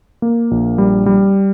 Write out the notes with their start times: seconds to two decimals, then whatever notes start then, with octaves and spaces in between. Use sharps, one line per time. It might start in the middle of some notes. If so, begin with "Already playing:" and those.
0.22 A#3
0.51 A#1
0.78 G3
1.06 G3